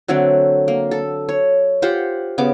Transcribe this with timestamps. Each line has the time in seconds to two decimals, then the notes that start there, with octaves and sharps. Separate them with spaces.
0.08 D3 F#3 A3 C4
0.68 A#3
0.91 A4
1.29 C#5
1.82 F4 G4 C5 F#5
2.38 C#3 B3 D6